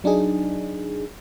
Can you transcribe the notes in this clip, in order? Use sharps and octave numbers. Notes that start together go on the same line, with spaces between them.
F#3 D4 D#4 G#4